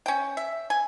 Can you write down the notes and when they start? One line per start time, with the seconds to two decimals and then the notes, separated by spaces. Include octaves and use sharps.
0.06 C#4 G5
0.37 E5
0.70 G#5